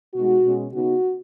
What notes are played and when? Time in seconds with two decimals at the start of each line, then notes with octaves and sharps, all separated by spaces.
0.14 B2 G#3 D#4 F#4
0.44 B2 G#3 C#4
0.73 C#3 B3 D#4 F#4